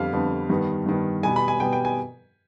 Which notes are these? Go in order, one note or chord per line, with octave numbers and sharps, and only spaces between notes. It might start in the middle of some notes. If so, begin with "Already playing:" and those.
Already playing: F2 D3 G3 B3 F5
F2 D3 G3 B3
G2 D#3 B3
G2 D#3 B3
B2 G3 B3 G#5
B5
G#5
B2 G3 B3 G5
G5
G#5